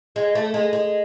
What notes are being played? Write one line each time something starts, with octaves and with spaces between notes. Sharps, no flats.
G#3
A3
G#3
G#3